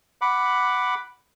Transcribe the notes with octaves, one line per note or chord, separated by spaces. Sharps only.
F#5 B5 D6